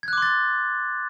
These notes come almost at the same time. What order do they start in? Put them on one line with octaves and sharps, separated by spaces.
G#6 F#6 D6 C6 A6